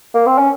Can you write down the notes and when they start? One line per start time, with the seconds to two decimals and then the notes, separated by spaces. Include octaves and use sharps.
0.14 A#3
0.26 C4
0.38 C#4